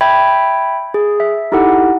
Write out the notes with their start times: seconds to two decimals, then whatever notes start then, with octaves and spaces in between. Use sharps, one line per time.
0.01 E5 G5 B5 G#6
0.94 G#4
1.20 E5
1.52 D#4 E4 G4 A4 F#5